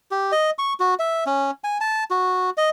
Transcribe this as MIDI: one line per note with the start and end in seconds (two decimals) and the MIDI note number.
0.11 0.32 67
0.32 0.50 75
0.59 0.73 85
0.80 0.94 66
0.99 1.24 76
1.27 1.51 61
1.64 1.78 80
1.81 2.04 81
2.11 2.50 66
2.57 2.70 75